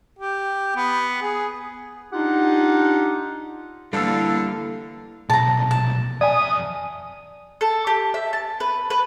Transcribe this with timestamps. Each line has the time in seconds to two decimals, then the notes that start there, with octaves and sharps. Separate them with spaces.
0.19 G4
0.76 B3
1.22 G#4
2.13 D4 D#4 F4 G4 F#5
3.93 D2 D3 E3 G3 A#3 A4 F5 E6
5.30 B1 A#2 A5 A#5
5.71 A5
6.21 F2 D5 E5 G#5 D#6
7.61 A4
7.87 G4
8.14 E5
8.33 A5
8.60 B4
8.90 B4